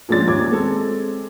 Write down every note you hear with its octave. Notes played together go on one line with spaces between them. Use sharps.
A#2 F3 G#3 C#4 D5 A6
D#2 C#4 D6 G#6
G#3 C4 A4